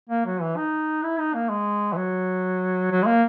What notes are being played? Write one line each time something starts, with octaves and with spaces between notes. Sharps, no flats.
A#3
F#3
E3
D#4
E4
D#4
A#3
G#3
E3
F#3
F#3
G#3
A#3